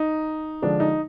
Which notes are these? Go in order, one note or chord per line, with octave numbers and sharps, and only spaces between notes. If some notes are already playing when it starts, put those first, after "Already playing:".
Already playing: D#4
D3 F3 G#3 D4
D#4